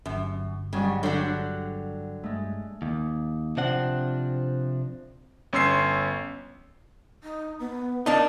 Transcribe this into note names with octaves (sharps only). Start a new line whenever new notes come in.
G1 F#2
G#2 C#3 F#3 G3
D3 F#3 D4 C#5 G5
G2 G#3 A3
D#2
C3 F3 C4 D4 F#5
G1 C#4 C6 E6 C7
D#4
B3
A#3 D4 D#4